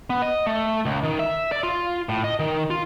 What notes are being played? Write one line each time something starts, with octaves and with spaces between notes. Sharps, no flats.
B3
D#5
A3
C#2
D#3
E5
D5
F4
A2
D#5
D#3
F4